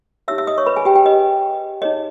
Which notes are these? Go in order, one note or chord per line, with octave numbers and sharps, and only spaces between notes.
D#4 G4 C#5 E5 E6
E5 E6
D#5 D#6
C#5 C#6
B4 B5
G#4 G#5
G4 G5
G4 G5
G4 B4 D#5
D#4 G#4 C#5 D#5